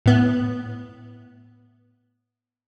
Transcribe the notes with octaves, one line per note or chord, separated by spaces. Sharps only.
A2 B3